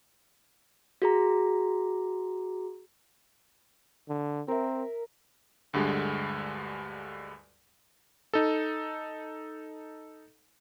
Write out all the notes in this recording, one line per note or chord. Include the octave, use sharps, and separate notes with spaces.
F#4 G#4 A#5
D3
C4 A#4 E5
D2 G2 D3 G3 G#3
D#4 A4